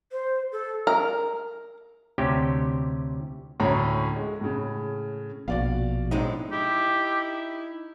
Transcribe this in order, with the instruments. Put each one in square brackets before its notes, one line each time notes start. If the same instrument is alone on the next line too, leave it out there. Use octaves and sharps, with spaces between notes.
[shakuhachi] C5
A4
[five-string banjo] A#4
[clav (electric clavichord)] D2 C3 C#4 G4 G5
[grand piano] D2 A2 C#4 A#5
G#3
A2 C#3
[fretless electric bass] A#1 [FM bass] B2 [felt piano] F#4 D5 F5
[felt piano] A2 D4 D#5 [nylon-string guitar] G#3 C4 D#4
[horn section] D#4 E4 [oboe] G4